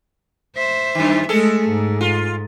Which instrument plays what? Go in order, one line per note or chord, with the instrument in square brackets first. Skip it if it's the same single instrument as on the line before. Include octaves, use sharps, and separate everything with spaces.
[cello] C5 E5
[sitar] F#2 D#3
[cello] G#3 A3 [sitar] G#4 A4
[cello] G#2
[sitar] F4